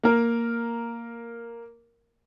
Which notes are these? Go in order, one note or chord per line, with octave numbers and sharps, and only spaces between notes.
A#3 A#4